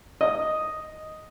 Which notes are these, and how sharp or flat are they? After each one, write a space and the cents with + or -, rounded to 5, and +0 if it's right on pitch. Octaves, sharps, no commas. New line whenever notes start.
D#5 +0 D#6 +0